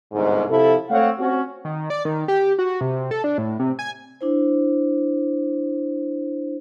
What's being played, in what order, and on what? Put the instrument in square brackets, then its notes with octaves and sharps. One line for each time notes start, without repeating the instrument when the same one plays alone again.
[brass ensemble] G1 C2 G#2
C3 F3 E4 A4
A3 C4 C#5 F5 F#5
C4 C#4 F#4
[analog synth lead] D#3
D5
D#3
G4
F#4
C3
A4
D4
A2
C3
G#5
[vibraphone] D4 E4 C5